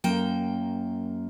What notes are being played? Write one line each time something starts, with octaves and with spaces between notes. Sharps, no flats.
F#2 A#3 G5